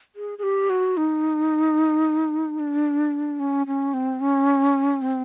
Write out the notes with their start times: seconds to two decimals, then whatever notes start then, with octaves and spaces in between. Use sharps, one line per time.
0.16 G#4
0.38 G#4
0.43 G4
0.70 F#4
0.97 D#4
2.59 D4
3.40 C#4
3.67 C#4
3.94 C4
4.20 C#4
5.02 C4